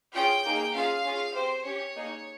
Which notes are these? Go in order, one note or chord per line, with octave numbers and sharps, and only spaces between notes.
C#4 F4 G#4 G5
A#3 D#4 G#4
C#4 F4 G#4 F5
C#4 F4 G#4
C4 G4 C5
C#4 G4 C#5
A#3 D#4 G#4